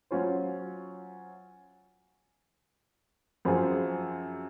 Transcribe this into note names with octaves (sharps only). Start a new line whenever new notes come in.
F#3 C#4 F4 C5
F#2 F3 C4 F4 G#4